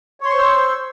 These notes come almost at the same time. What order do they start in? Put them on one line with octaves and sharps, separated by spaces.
C#5 C6 C#6 C5 E6